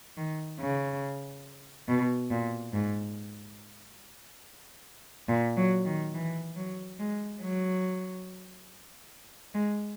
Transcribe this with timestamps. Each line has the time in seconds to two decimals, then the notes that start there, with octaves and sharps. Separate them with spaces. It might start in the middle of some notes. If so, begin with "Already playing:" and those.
0.17 D#3
0.60 C#3
1.89 B2
2.31 A#2
2.73 G#2
5.29 A#2
5.57 F#3
5.86 D#3
6.15 E3
6.56 F#3
6.99 G#3
7.42 F#3
9.55 G#3